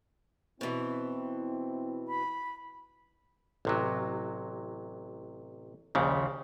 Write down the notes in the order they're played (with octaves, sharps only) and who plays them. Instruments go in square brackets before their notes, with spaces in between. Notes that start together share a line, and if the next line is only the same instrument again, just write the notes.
[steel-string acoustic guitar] B2 E3 [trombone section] C4 E4
[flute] B5
[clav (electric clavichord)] A1 C3 F#3
A#1 D#2 A#2 C#3